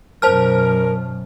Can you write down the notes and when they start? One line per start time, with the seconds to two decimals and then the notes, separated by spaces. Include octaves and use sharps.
0.22 F#2 B2 A#4 C5 A5 F6